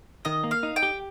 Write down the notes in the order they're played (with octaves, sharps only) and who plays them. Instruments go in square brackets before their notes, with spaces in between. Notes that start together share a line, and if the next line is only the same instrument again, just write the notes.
[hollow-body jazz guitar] D#3 [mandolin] D#5
[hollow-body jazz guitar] A#3
[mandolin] F5
[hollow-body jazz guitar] D#4
[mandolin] G5
[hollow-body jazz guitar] G4